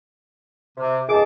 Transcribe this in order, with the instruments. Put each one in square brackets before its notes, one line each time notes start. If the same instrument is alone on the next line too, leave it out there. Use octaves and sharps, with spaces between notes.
[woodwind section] C3
[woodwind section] C#2 A5 D6 [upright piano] G#4 D#5